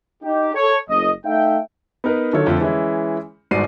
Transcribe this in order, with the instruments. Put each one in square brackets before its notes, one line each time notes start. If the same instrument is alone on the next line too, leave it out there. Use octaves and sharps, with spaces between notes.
[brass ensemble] D#4 G4
A4 C#5
F#1 D#5
A3 D#4 E5 F5 G5
[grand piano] B3 D#4 A#4 B4
D3 D#3 F#3 F4 A4 C#5
F2 D3 F3 A3
E3 G#3 C#4 E4
G1 G#2 F#4 D5 C7 D#7